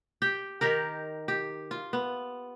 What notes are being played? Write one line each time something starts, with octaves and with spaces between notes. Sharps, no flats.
G4 G5
D#3 G4 A#4
G4
F4
B3